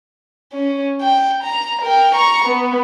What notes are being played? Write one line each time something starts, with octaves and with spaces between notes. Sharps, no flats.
C#4
G5
A#5
A#4 G5
A#5 C#6
B3